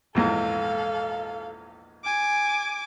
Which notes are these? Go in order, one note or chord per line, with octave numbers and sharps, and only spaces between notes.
A#1 E2 G#2 A4 F5
G#5 D6